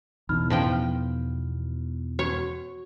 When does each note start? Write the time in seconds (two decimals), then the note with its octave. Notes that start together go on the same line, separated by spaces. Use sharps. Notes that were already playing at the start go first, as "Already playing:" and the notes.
0.29 E2 B2 E3 D#4 B5 F6
0.50 A2 F3 G5
2.19 F#4 C#5